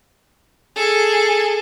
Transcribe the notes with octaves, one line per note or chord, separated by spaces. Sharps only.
G#4 A4